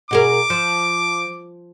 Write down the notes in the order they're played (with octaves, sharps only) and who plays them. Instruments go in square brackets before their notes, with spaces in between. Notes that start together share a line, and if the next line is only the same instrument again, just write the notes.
[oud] B2 G#4 A#4 [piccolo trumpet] D6
[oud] F3